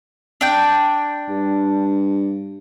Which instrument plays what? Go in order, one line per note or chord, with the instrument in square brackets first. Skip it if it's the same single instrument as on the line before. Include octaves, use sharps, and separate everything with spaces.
[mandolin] D4 G5
[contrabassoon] G2